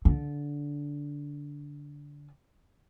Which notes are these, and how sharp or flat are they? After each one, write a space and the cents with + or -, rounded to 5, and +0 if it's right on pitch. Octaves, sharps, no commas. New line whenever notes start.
D3 -15